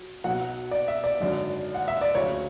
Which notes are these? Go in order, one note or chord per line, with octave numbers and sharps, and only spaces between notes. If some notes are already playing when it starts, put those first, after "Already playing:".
Already playing: F#3
B1 B2 F#3 F#5
D5
E5
D5
G#1 F#2 D3
F#5
E5
D5
D2 C#3 F#3 C#5